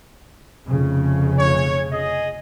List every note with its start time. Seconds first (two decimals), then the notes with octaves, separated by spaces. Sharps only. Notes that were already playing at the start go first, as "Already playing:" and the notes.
0.68 F1 C#3
1.39 C#5
1.92 G#4 D#5